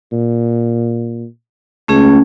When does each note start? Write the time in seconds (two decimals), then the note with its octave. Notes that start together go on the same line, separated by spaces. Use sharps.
0.12 A#2
1.88 C#2 A3 C#4 G#4